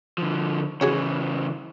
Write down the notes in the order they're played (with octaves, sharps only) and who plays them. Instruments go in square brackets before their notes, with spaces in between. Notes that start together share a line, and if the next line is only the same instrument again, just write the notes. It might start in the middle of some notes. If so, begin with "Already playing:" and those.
[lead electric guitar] D3 F3
[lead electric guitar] C#3 E3 [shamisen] F#4 G#4 C#5